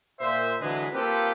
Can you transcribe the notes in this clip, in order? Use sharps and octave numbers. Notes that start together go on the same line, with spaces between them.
A#2 C5 E5
D3 E3 F#3 G#3 G#4 B4
A#3 C4 F4 G4 A4 B4